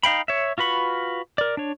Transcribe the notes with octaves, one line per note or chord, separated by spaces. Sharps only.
D#4 F5 G5 B5
C#5 E5
F4 F#4 B4 B5 C#6
A#4 D5
D4 C#5